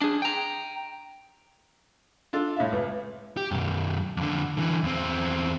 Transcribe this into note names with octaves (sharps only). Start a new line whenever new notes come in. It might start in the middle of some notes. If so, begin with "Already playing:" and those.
D4 G#4
G5 A#5
D4 F4 A4
A2 E5 F5
C#2 B4
G4
B1 F#2
F2 D3
D3 E3
E2 C4